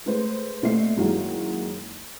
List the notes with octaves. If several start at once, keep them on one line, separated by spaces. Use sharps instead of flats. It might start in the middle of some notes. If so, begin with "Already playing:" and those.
G#3 A3 B4 C5
A#2 A3 C4 D#5 E5 C7
F#2 D#3 F#3 G#3 A#3 E4